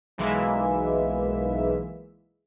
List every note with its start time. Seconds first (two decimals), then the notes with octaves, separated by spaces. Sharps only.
0.18 B1 E3 G#3 A#3 E5